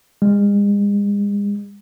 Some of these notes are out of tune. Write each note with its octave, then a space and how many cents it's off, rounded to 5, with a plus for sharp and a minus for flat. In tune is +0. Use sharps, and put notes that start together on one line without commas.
G#3 -40